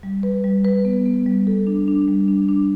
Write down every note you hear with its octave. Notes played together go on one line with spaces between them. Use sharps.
G3
B4
G3
B4
B3
B3
G3
A4
D4
D4
G3
D4
D4